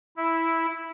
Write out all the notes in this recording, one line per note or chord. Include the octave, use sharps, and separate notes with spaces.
E4